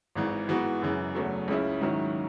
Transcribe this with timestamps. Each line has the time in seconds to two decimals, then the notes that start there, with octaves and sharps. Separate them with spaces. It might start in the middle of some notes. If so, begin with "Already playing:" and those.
0.15 G#1 G#2 E3
0.48 G#2 E3 G#3 B3 F#4
0.82 F#2 C#3 E3 G#3
1.15 E2 C#3 F#3 A3
1.48 C#2 C#3 G#3 C#4 E4
1.81 G#2 D#3 F#3 C#4 E4